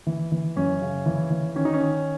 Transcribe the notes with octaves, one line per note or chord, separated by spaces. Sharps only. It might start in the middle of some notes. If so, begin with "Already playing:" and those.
E3
E3
F#2 C#4
C#3
E3
E3
D#3 C#4
D#4
C#4
D#3